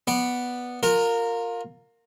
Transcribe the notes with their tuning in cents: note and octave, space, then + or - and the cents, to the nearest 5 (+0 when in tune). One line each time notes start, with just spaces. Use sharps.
B3 -5 D5 +0
F4 +20 A#4 -15